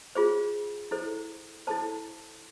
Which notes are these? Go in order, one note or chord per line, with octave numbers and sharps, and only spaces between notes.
F4 G#4 C5
E4 A4 C5
E4 A4 C5 A5